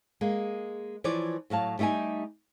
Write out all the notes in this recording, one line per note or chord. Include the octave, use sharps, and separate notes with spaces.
G#3 A#3
E3 F3 C#5 D5
A2 F#3 F5 A5
G3 A3 D#4 G4 G#5